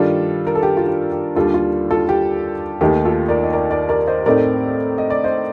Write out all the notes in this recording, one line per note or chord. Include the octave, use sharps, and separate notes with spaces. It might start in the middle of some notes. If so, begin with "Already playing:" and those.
Already playing: G2 D#3 G3 D4 F4 A4
A#4
A4
G4
F4
G4
G4
D#2 D3 G3 D4 F4 A4
F4
F4 A4
G4
D#2 D#3 A3 D#4 G4
F4 A4
A#4 D5
D#5
A#4 D5
A#4 D5
A#4 D5
C5 D#5
A2 A3 C4 D#4 A#4 D5
D#5
D5
C5 D#5